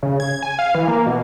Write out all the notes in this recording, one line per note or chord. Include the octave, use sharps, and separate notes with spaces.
C#3
G#6
G#5
F5
E3
A#3
B2